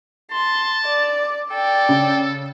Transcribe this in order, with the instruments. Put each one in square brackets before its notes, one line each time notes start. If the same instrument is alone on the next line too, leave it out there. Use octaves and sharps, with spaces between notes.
[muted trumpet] A5 [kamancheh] C6
[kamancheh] D5
[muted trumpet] A4 [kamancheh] D5 G5
[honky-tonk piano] C#3